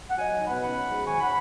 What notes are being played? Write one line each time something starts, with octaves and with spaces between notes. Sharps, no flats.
F#5
F#3 D#5 G#5
D#4
B2 F#5 B5
C#4 F#5 B5
F#3
G#2
D#3 G#5 C#6
C#4 F#5 B5